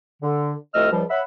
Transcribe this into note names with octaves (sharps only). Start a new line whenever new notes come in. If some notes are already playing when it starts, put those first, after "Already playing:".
D3
C2 F2 A3 D#5 E6 F6
C#2 F3 G3
C#5 E5 F#5 B5